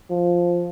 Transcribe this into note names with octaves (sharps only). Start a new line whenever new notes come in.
F3